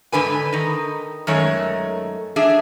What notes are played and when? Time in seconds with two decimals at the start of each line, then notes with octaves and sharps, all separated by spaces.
0.12 G#2 D3 B4 G#5
0.52 D#3 D#4
1.27 F#2 D#3 G#3 A3 C#5
2.36 D4 G#4 E5